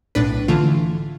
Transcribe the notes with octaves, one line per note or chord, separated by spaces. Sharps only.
B1 A2 D4 B4
D3 E3 A3 F4